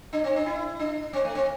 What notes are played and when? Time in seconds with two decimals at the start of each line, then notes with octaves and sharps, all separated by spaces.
0.13 D4
0.24 C4
0.36 D4
0.46 E4
0.79 D4
1.13 C4
1.25 A3
1.35 C4